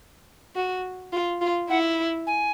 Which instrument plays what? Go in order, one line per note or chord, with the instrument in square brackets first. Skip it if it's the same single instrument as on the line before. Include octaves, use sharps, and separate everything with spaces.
[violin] F#4
F4
F4
[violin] E4 [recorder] F#5
[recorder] G#5